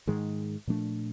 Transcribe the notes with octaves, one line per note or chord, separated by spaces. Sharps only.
G#2 D#3 G#3
A#2 F3 A3 D4